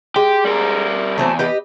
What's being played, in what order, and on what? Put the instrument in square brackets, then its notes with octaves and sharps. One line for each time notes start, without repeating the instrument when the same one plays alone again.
[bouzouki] G#3 [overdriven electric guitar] G4
[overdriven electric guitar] G3 A#4
[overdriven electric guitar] E2 [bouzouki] F#3 A3 C4
[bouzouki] G4 B4 D#5